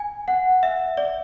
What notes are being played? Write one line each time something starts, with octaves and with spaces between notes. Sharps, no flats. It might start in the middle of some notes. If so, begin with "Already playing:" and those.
Already playing: G#5
F#5
E5
D5